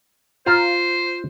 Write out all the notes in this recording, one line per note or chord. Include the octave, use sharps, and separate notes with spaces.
F4 C5 A#5